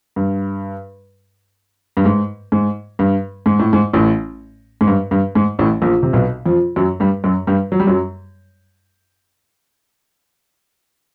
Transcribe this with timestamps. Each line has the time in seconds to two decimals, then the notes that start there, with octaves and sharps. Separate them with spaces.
0.16 G2
1.97 G2
2.05 G#2
2.52 G#2
2.99 G2
3.46 G#2
3.59 A2
3.73 G#2
3.93 A1 A2
4.81 G#2
4.87 G2
5.11 G2
5.35 G#2
5.59 A1 A2
5.82 A#1 A#2
6.03 C3
6.13 B1 B2
6.46 F2 F3
6.76 F#2 F#3
7.00 G2 G3
7.24 F#2 F#3
7.47 G2 G3
7.72 F#3
7.80 G3
7.87 F#2 F#3